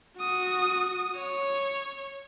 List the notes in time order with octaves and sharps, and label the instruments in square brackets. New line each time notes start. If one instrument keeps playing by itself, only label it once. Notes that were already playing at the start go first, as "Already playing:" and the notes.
[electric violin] F#4 D#6
C#5